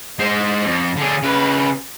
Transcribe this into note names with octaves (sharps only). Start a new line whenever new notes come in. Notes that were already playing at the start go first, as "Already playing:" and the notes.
G#3 C5
F2
D3 G#4
C#3 B4